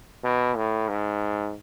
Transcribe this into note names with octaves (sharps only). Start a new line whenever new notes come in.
B2
A2
G#2